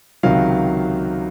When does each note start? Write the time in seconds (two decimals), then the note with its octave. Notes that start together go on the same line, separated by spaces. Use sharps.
0.23 C#2 C3 D#3 F#3 F5